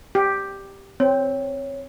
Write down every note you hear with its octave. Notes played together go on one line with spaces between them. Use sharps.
G4
C4 C#5